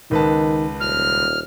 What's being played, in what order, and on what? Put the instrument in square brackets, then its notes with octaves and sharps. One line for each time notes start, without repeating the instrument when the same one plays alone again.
[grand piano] C#2 B4 A5 [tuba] D#3
[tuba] D#1 [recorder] F6